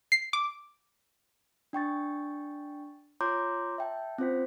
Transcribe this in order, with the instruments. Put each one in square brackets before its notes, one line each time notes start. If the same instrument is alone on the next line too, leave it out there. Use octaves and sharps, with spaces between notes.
[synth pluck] C7
D6
[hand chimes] D4 G5 C#6 A6
F4 C#5 A#5 C6 D6 G6
E5 G5 A5
C4 C#4 F4 C5 G6 B6